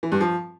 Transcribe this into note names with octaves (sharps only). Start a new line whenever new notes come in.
E3
G2
F3